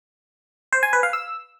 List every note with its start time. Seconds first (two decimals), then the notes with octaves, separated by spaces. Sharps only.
0.73 C5
0.83 G#5
0.93 B4
1.03 F5
1.13 E6